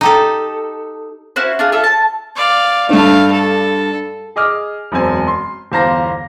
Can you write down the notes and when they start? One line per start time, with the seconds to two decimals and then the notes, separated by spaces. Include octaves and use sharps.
0.01 D#4 G4 A4
1.36 C#4 E4 F#4 C5
1.59 D4 F4 G#4
1.72 F4 A4 E5
1.84 A5
2.36 D5 F5
2.89 G2 A3 D4 F5
3.32 A4
4.36 G#4 D#5 D6 F6
4.92 E1 F#2 C4 C5 G#5
5.27 C6
5.72 G1 E2 C5 F5 A#5 A#6